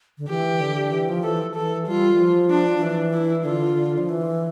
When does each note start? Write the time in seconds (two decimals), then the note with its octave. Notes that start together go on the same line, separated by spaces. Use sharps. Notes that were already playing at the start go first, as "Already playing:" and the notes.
0.18 D3
0.29 E3 G4
0.61 D3
0.92 E3
1.09 F3
1.24 E3 A4
1.55 E3 A4
1.87 G3 F4
2.13 E3
2.19 F3
2.50 D4
2.77 F3
2.82 E3
3.13 E4
3.45 D3 F4
3.98 F3
4.09 E3